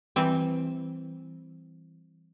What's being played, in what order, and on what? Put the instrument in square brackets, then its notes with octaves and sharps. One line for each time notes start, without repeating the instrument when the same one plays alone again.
[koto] E3 G3 C4